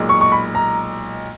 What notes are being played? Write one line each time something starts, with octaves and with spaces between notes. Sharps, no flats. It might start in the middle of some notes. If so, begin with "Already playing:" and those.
Already playing: B1 A#2 G#3
C#6
C#6
B5
A#5